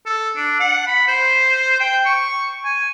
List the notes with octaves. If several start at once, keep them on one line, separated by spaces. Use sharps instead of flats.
A4
D4
F#5
B5
C5
G5
C#6
G#5